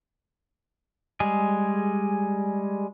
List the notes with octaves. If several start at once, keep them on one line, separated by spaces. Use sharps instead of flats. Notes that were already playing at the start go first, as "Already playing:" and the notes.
G3 G#3 G#4